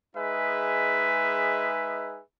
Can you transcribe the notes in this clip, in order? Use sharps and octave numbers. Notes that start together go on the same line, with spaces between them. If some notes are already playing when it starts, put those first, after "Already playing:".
G#3 D#4 G#4 B4 E5